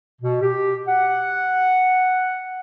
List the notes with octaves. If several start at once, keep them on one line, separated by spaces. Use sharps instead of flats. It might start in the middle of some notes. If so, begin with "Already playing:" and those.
B2
G4
F#5